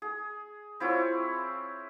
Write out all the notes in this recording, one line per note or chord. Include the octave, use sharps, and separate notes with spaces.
G#4
C4 E4 F4 C#5